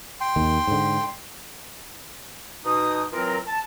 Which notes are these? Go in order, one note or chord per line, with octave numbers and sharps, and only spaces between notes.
G5 C6
D#2 D#3
G#2 D3
B2 D#4 D#6
E3 F#3 C4 F4 A#4
A5